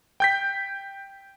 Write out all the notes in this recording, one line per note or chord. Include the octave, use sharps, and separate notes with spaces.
G5 G6 B6